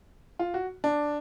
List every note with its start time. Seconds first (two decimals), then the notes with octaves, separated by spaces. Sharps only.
0.39 F4
0.54 F#4
0.84 D4